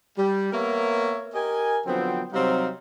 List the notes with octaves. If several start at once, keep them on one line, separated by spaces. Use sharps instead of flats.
G3
A#3 B3 A#4 C#5 E5
G4 A#4 D#5 G#5
D3 F3 F#3 B3 C4
C3 F#3 G3 C4 D#4 F5